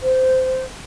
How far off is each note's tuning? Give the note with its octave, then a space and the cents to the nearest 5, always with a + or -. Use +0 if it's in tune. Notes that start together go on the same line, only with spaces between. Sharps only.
C5 -15